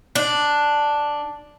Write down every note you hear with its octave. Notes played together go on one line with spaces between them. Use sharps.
D4